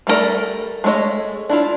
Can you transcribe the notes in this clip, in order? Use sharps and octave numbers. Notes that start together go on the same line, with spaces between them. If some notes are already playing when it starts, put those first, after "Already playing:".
G3 A3 C#4 A#4 D5
G#3 A3 E4 C#5 D#5
D4 E4 F4